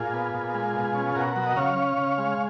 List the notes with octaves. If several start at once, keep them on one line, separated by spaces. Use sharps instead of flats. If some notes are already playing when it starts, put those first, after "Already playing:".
Already playing: A#2 F4 G#4
B3
A#2
G#3
B2
C#4
B2 F#4 A#4
F#3
D#5
C#3 C#5 F5
C#4
C#3
G#3